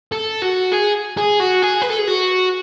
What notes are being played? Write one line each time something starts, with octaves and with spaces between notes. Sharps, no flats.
A4
F#4
G#4
G#4
F#4
G#4
B4
A4
G#4
F#4